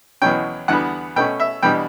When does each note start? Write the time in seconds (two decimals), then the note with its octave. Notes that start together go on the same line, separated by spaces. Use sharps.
0.22 E2 B2 F#3 C#4 G5
0.68 E2 D3 G3 B3 F#5
1.16 B2 A3 C#4 G5
1.40 E5
1.63 E2 B2 G3 D4 G5